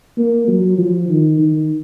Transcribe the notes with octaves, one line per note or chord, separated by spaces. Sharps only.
A#3
F#3
F3
D#3
D#3